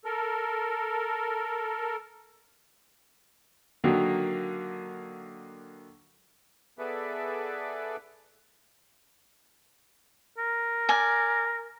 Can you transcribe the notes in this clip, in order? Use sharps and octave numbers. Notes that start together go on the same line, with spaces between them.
A4 A#4
D3 D#3 F#3 A#3
B3 G#4 A4 B4 D5 E5
A#4
D5 G#5